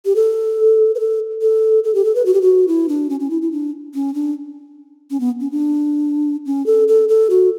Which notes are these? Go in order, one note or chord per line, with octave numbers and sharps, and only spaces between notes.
G4
A4
B4
A4
A4
A4
G4
A4
B4
F#4
G4
F#4
E4
D4
C#4
C#4
E4
E4
D4
C#4
D4
C#4
B3
C#4
D4
C#4
A4
A4
A4
F#4